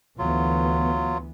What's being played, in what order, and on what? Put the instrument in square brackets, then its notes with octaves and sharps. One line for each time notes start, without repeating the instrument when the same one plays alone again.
[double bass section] D2 E3 B3 [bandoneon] F#3 F4